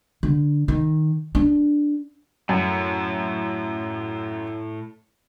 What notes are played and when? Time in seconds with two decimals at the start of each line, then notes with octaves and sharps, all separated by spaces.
0.23 D3
0.68 D#3
1.35 D4
2.49 F#2 A2